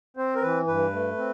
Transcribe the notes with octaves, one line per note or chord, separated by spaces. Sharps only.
C4 C5
A#4
E3 B4
G2 B4
A3
C4